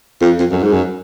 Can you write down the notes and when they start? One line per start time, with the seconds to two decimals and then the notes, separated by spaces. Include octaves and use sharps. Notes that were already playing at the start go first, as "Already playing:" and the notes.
0.21 F2
0.40 F2
0.52 F#2
0.63 G#2
0.72 F#2